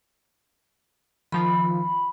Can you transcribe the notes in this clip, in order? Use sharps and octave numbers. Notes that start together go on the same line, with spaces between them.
D#3 F3 F4 B5